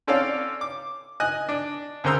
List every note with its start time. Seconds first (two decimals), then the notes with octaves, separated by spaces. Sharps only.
0.07 C4 C#4 A4 C#5 D5 F5
0.61 D6
1.20 D#5 G#5 F#6
1.49 D4
2.04 D2 C#3 A#4 C5 A#5 E6